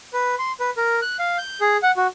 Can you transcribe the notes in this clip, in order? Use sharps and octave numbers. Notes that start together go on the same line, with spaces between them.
B4
C6
B4
A#4
F#6
F5
G6
G#4
F#5
F#4